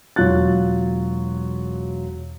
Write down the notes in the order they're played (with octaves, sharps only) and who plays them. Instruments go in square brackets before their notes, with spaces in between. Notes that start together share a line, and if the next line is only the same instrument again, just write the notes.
[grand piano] E1 F#3 F4 F#6 A6